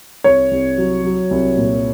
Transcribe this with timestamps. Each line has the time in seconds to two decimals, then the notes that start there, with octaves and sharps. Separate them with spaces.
0.24 C2 C#5
0.51 C2
0.78 F#3
1.04 F#3
1.31 C2
1.58 A#2